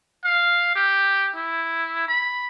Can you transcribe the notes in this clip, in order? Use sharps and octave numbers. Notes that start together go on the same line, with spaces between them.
F5
G4
E4
B5